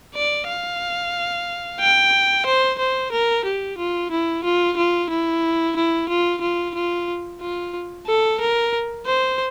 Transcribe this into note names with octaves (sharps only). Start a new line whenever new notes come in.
D5
F5
G5
C5
C5
A#4
G4
F4
E4
F4
F4
E4
E4
F4
F4
F4
F4
A4
A#4
C5